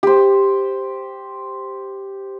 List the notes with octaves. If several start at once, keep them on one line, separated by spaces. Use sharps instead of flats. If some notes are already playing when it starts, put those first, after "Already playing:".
G4 C5